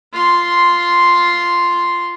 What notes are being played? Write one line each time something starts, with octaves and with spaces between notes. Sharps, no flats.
F4 C6